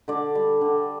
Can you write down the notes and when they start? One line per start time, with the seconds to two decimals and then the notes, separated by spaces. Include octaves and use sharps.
0.08 D3 D5
0.35 G3
0.61 D3